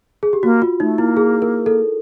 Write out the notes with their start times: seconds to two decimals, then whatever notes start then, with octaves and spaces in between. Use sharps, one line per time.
0.23 G#4
0.33 G4
0.43 A#3 F#4
0.62 F4
0.80 A3 D#4
0.98 A#3 E4
1.17 G#4
1.42 A#4
1.66 A4